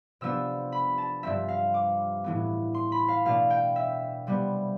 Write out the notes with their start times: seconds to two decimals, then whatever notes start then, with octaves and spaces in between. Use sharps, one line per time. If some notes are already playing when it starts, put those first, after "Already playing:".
0.21 C3 F3 B3 D4 E6
0.72 B5
0.98 A5
1.23 G2 F3 C4 E5
1.49 F5
1.74 D6
2.24 A2 E3 B3
2.74 C6
2.92 B5
3.08 F5
3.25 B2 A3 D4 F5
3.50 G5
3.76 E5
4.27 C3 G3 B3